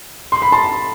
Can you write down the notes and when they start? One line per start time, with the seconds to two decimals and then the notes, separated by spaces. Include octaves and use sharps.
0.32 C6
0.42 B5
0.52 A5 C6